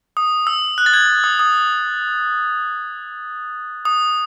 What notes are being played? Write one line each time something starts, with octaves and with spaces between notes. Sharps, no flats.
D#6
E6
F#6
A6
G#6
D#6
D#6
D#6